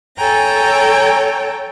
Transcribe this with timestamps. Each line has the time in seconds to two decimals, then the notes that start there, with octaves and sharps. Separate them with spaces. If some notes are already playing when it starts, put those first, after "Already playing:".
0.16 A4 C#5 G5 G#5 A#5